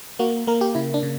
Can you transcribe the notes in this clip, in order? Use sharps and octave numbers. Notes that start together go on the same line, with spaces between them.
A#3 F#4
A#3 A#4
G4
C#3 E4
D4
C#3